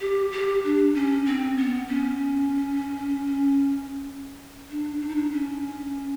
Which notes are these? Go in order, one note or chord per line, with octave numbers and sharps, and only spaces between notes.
G4
G4
D4
C#4
C4
B3
C#4
D4
D4
D#4
D4
C#4